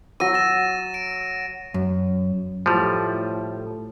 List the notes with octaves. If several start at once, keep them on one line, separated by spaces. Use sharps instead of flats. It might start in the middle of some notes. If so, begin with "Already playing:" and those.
F#3 E6 A#6 D#7
A6 A#6 E7
D7
F#2
A2 F3 G3